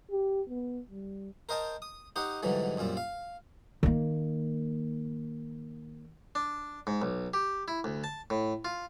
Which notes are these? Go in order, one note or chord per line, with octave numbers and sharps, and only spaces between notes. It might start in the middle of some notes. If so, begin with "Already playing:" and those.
G4
B3
G3
A#4 C5 D#5 G5 A5
D#6
D#4 G4 C5 D#5 F#5
G#2 D3 E3 F#3 G3
F#2 A#2 G3 C4
F5
D#3 A#3
D4
G#2
B1
G4
E4
D2
A5
A2
F4